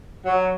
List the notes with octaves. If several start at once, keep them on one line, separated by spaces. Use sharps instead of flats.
F#3